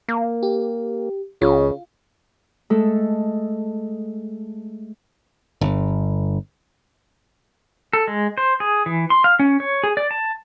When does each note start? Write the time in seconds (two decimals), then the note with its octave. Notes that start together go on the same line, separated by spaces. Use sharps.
0.08 A#3
0.43 G4
1.42 C#2 C#3 F4
2.70 G#3 A3 A4
5.61 G1
7.93 A4
8.08 G#3
8.38 C5
8.60 G#4
8.86 E3
9.10 C6
9.24 F5
9.39 C#4
9.60 C#5
9.83 G#4
9.97 D5
10.11 A5